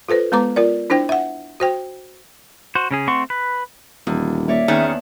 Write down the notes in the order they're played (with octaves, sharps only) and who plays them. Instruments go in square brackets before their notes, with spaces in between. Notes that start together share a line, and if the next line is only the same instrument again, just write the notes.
[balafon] F4 A4 B4 C5
G#3 B3 B4 A#5 D6
F4 A#4 D5
D4 E4 C5 G5
E5 F#5
F#4 C5 G5
[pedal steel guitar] F#4 C5
C#3 C#4 G#4
A3 C4 F#5 C6 C#6
B4
[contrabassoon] D#1 [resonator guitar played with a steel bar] E2
[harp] A#3 C#5 D5 [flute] E5
[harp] E2 A5 F#6 [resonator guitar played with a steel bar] D#3 C#4 G#4